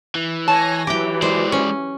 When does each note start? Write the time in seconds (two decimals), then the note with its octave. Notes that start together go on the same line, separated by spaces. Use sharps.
0.15 E3
0.48 C#5 G#5 A5 A#6
0.87 E3 F#3 G4 G5
1.22 G#3 C5 D5
1.52 C#4